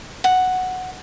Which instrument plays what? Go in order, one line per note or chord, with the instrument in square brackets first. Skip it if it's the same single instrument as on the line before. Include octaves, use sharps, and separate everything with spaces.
[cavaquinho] F#5